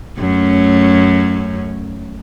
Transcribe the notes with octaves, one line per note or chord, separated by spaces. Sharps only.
F#2 A3 C#4